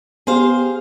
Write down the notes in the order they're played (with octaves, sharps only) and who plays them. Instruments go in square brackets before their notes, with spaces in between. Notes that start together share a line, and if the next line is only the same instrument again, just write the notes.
[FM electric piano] B3 G4 [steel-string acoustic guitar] G#4 C5 F5